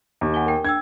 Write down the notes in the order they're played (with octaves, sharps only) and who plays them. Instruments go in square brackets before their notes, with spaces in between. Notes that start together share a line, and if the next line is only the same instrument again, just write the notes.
[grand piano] D#2
[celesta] F#5 G#5 G7
A#4 G5
[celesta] D4 G5 E6 [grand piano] G#6